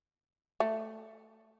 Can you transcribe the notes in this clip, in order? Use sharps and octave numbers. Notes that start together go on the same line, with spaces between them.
A3